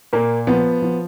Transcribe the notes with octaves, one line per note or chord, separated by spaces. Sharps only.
A#2 A#3
F3 B3
F3